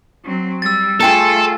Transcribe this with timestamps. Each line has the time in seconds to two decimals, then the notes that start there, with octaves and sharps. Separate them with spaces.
0.23 F#3 C4
0.62 G3 E6 A6
1.00 A3 F4 G#4 A4 G5 A5